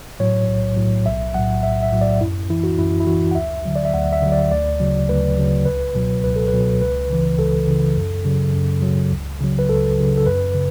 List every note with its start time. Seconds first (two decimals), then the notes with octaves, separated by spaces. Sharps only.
0.20 A2 F#3 C#5
0.48 B1
0.77 A2 F#3
1.06 B1 E5
1.34 A2 F#3 F#5
1.63 B1 E5
1.83 E5
1.92 A2 F#3
2.01 D5
2.20 F#2 E4
2.50 E3 E4
2.63 F#4
2.78 F#2 E4
3.00 E4
3.07 E3 F#4
3.31 F#5
3.35 D2 E5
3.65 D3 F#3
3.76 D5
3.85 E5
3.94 D2 F#5
4.13 E5
4.22 D3 F#3
4.32 D5
4.51 D2 D5
4.80 C#3 F#3
5.09 D2 B4
5.37 C#3 F#3
5.66 C#2 B4
5.95 B2 F#3
6.24 C#2 B4
6.36 A4
6.48 B4
6.53 B2 F#3
6.81 C#2 B4
7.09 C#3 E3
7.39 C#2 A4
7.67 C#3 E3
7.96 F#2
8.25 C#3 F#3
8.54 F#2
8.82 C#3 F#3
9.11 C#2
9.40 C#3 F#3
9.59 B4
9.69 C#2 A4
9.98 C#3 F#3
10.18 A4
10.26 F#2 B4
10.55 C#3